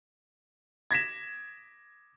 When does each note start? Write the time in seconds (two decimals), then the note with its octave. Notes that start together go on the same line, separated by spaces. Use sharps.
0.91 G#6 A#6 B6 E7